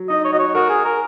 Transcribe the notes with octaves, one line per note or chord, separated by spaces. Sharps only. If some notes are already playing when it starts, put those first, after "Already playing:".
Already playing: F#3
D#4 D#5
C#5
F#4 D#5
C#5
F#4 A#4
G#4
A#4